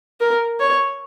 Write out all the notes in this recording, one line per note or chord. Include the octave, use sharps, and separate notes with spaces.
A#4
C#5